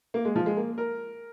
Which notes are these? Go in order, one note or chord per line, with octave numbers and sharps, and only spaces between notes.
A#3
G#3
F3
G#3
A#3
A#4